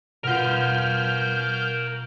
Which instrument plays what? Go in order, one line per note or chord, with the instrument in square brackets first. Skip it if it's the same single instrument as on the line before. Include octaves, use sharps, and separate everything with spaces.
[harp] B2 F4 [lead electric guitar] A#4 F#5 [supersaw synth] F6 G6